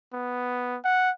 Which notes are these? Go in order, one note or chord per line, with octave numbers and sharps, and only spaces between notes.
B3
F#5